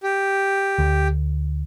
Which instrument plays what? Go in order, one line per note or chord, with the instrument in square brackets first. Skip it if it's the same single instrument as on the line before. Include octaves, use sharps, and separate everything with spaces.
[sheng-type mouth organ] G4
[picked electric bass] D2